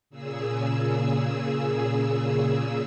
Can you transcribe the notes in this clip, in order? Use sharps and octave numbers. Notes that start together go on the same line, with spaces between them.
A#2 C#3 G#4 E6